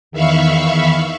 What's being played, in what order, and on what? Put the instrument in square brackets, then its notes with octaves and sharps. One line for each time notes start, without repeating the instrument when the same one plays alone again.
[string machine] E2 D#3 E5 F5 B5 C#6